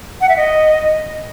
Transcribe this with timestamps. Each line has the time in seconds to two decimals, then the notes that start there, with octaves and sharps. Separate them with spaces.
0.21 F#5
0.29 E5
0.37 D#5